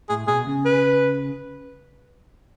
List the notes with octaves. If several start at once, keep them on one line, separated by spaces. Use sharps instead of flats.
A2 G#4
B2 G#4
C#3
B4